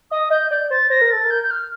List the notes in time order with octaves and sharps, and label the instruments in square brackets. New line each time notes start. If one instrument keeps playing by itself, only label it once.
[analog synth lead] D#5 [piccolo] D#6
[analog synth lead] D#5 [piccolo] G6
[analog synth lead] D5 [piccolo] G6
[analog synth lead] C5 [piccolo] A6
[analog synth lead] C5 [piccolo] A#6
[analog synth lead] A#4
[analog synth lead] A4 [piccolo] A6
[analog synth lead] A#4
[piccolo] G6
G6
F6